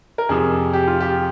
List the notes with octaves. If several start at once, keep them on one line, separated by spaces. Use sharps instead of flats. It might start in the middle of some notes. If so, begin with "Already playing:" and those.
A#4
F2 C3 F3 G#4
G4
F4
G4